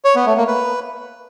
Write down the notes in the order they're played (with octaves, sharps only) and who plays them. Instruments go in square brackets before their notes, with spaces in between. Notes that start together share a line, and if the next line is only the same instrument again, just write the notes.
[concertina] C#5
B3
A3
A#3
B4